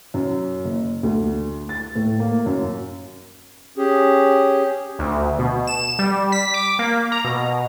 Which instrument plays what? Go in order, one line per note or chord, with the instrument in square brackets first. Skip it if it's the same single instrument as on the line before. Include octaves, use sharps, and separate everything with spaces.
[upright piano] F#2
F#1
D2
A6
A2
A#3
F#2
[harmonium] C#4 G4 G#4
[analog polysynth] D2
B2
E7
G3
B6
D6
A#3
A#5
B2